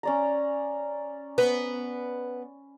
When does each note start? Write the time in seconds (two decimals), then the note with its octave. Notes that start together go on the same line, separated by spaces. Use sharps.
0.03 C#4 D5 A#5
1.38 B3